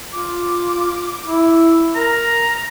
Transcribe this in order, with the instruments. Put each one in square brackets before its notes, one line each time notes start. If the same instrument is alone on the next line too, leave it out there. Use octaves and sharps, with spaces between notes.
[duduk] F4 [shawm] D6
[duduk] E4
[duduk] A#4 [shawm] A#5